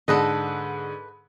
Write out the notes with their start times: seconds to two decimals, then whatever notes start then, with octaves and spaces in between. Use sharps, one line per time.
0.08 G#2 D3 A4 B4 D#5